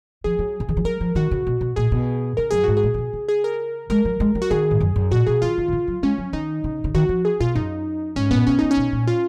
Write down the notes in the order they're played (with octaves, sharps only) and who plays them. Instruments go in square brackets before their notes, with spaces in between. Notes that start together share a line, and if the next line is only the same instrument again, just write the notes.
[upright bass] F3 [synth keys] G#4
[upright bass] F#3
C#3
D#3
F3
[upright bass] F#3 [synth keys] A#4
[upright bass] F3
[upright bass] D#3 [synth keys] F#4
[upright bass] C#3
B2
B2
[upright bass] A#2 [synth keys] G#4
[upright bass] B2
[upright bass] C#3 [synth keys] A#4
[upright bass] F#2 [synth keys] G#4
[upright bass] G#2 [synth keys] F#4
[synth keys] G#4
[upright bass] A#2
C#3
B2
C#3
[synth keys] G#4
A#4
[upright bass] G#3 [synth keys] A#4
[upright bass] F#3
G#3
F#3
[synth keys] F#4
[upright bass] D#3 [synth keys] G#4
[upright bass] G#2
F#2
F#2
[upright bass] A#2 [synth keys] F#4
[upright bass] B2 [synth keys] G#4
[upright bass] D#3 [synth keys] F4
[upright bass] D#3
B2
C#3
F#3
[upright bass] G#3 [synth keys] C#4
[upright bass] F#3
[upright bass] D#3 [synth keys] D#4
[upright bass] C#3
C#3
[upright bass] D#3 [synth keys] F#4
[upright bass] F3
[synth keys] G#4
[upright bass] B2 [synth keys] F4
[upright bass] F#2 [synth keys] D#4
[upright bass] G#2 [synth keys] C#4
[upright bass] A#2 [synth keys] B3
[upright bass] B2 [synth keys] C#4
[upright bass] C#3 [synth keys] D#4
[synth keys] C#4
[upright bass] B2
A#2
[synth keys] F4